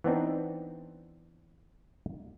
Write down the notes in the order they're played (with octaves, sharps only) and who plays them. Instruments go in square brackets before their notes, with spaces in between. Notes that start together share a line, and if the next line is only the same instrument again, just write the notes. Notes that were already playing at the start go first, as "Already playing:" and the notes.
[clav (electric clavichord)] E3 B3 C4 D4 D#4